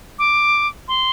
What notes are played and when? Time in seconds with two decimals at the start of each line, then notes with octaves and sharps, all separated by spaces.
0.19 D6
0.88 C6